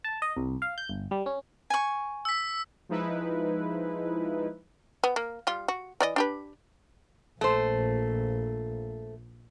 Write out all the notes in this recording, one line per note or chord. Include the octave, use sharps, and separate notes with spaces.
A5
D#5
C2
F5
G6
G1
G3
C#4
G#5 C#6
E6 B6
F3 G#3 D#4 E4 B4
B3
A#3
G3 F4
F#4
E3 D5 D#5
D4 G4 B4
A#1 A3 C5